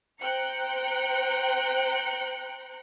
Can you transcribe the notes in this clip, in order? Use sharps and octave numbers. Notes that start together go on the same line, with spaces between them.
C5 G5 A#5 F#6 C#7